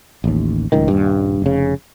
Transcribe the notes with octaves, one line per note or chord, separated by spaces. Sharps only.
A1 D#2
D1 C#2 D#3
D#1 G2
F1 C#3